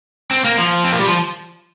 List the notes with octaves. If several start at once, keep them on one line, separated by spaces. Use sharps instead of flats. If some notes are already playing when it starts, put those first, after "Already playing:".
C4
A#3
F3
C4
A#3
G3
F3